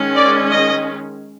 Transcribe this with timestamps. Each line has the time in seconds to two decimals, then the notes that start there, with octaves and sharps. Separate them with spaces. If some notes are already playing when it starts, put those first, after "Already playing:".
Already playing: D#3 G#3 C#4
0.15 D5
0.50 D#5